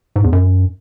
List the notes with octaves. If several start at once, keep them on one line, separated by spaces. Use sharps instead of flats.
G#2
E2
F#2